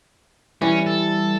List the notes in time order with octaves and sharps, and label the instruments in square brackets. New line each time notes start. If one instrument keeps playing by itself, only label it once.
[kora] E3 [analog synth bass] G3 [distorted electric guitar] C#4
[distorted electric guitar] A4